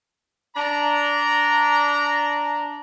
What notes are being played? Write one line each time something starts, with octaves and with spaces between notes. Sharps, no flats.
D4 A#5